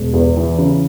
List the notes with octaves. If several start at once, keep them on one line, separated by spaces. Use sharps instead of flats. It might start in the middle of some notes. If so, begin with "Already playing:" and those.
Already playing: E1
E2
E3
C#3